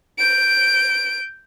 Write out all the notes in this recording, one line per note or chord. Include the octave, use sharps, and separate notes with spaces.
G6 D7